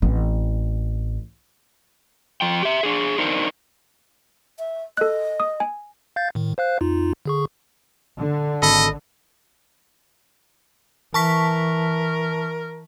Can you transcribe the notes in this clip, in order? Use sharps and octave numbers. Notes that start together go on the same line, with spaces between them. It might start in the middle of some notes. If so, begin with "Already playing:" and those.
A1 C4
F3 G5
G4 E5
D4 G#4
D4 D#4 A#4 C5
E5
A4 D#5 F#6
D#6
G#5
F5 G6 A6
A2 D#3
C5 F5 F#6
F2 D#4 F4
D3 G#4 C#6
D3
G#1 A4 D#5 B5
E3 A#4 A5 C#6 B6